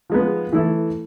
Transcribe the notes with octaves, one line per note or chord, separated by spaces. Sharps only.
F3 G#3 B3
E3 A3 E4 A4